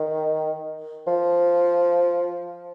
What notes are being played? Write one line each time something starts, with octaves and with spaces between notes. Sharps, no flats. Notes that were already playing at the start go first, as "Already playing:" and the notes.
Already playing: D#3
F3